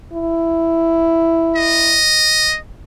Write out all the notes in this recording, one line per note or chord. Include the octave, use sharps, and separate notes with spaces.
E4
D#5